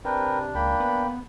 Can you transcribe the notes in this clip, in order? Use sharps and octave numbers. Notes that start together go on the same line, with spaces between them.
C3 D4 A#4 B4 G5
C#2 A#3 G5 B5
B3